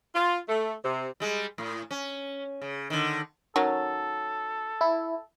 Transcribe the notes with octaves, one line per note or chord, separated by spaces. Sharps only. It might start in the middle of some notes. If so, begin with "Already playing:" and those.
F4
A3
C3
G3 G#3
A2
C#4
C#3
D3 D#3
D#3 F#3 C#4 A4
E4